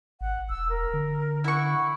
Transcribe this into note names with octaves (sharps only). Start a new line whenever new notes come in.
G#1 F#5
E1 E6
A#4
D3
E4 F#5 C#6